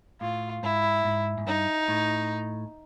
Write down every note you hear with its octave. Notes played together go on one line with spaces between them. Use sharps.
A2 F4
G#2 E4
G#2
G#2
G2 D#4
A2